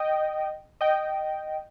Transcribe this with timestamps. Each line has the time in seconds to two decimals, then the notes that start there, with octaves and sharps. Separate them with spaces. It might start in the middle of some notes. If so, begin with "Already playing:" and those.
Already playing: D#5 G5
0.81 D#5 G5